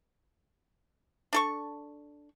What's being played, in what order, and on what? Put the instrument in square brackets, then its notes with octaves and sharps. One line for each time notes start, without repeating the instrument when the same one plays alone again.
[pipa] D4 A4 C#6